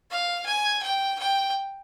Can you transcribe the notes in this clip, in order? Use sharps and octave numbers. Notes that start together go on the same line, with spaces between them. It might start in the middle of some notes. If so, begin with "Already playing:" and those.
F5
G#5
G5
G5